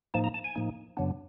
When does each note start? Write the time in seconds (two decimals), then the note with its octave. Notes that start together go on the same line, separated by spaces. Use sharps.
0.14 A2 F3 A#3 D#4 A5
0.24 A#5
0.34 A5
0.44 G#5
0.56 A2 F3 A#3 D#4
0.97 F#2 C#3 F#3 B3 D4